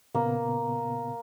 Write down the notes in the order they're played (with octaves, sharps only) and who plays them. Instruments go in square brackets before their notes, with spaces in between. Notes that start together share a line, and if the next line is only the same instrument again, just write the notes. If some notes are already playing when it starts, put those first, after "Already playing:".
[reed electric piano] A#2 C#3 B3 [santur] A#3